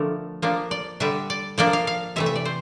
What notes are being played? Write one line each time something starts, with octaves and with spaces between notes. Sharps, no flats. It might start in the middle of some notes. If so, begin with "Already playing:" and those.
Already playing: D3 F3 A3 D4 A#4
F3 A#3 D4
D5
D3 G3 D4 E5
D5
F3 A#3 D4 D5
F5
F5
C3 E3 A3 E5
E5
D5
C5